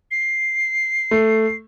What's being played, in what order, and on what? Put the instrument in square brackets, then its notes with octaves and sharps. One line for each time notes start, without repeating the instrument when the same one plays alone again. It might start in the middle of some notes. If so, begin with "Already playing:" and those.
[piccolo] C7
[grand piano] A3